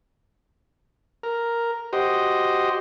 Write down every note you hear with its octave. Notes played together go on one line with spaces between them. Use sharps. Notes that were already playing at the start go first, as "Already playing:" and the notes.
A#4
F#4 G4 C5 D#5